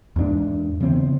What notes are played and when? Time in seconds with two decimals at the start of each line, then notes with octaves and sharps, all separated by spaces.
0.16 E2 G#2 A#3 D4
0.80 C#3 E3 B3 C4